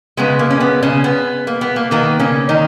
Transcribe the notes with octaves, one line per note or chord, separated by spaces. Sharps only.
C#3 G#3 B3
A#3
C#4
B3
C#3 C#4
B3
A#3
B3
A#3
D#3 A#3 B3
C#3 C#4
D#3 D#4